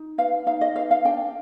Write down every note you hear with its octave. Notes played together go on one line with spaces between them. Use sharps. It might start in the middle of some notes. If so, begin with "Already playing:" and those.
Already playing: D#4
B4 F5
D#4 F5
D#5
B4 F5
F5
D4 G5